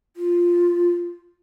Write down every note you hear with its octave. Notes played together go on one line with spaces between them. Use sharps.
F4